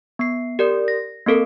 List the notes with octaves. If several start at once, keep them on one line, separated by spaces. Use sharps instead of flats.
B3 C7
G4 A#4 D5
A#6
A#3 C4 A4 A#4